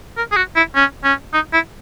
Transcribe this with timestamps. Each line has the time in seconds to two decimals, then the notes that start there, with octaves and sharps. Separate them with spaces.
0.17 A#4
0.32 G#4
0.36 F#4
0.56 E4
0.75 C#4
1.04 C#4
1.34 D#4
1.53 E4